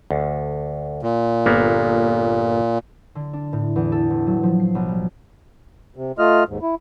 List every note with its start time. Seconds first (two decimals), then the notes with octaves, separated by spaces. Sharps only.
0.11 D2
1.03 A#2
1.46 G1 A#3 B3
3.15 D3
3.33 D4
3.53 A2
3.76 E2
3.92 A4
4.10 E1
4.27 F#3
4.43 F3
4.60 C7
4.75 B1
4.88 G3
5.96 C3
6.18 A3 F4 D#5 F6
6.49 D#2 G#2
6.62 E4